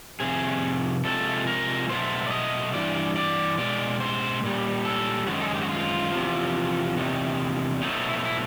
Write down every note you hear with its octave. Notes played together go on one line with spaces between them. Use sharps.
F2 C3 G#4
C3 F3 G#3 A4
A#4
B2 F#3 A3 C5
D5
D#5
G2 E3 D5
D5
B2 G#3 D5
C5
A#2 G3
A4
F#2 D#3 G#3 F#4
A4
G#4
G4
F#4
F4
E2 C3 F3
E2 C3 D#3
B2 F#3 A3 D#4
E4
D#4
E4